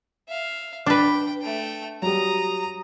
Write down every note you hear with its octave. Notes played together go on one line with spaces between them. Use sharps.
E5 F5
D4 B4 G5
A3 G5
F#3 G3 A#5 D#6